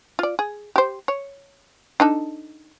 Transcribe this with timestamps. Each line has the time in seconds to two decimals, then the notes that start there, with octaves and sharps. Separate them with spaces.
0.19 F4 D5
0.39 G#4
0.76 G4 C5
1.08 C#5
2.00 D4 D#4 A4